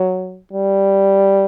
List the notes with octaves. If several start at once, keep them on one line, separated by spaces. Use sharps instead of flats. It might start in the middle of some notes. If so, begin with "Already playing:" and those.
Already playing: F#3
G3